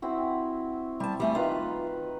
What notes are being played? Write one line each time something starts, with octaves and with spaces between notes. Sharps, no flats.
C4 E4 F#4
G3 A5
G3 A3 G#5
D#3 D#4 F4 B4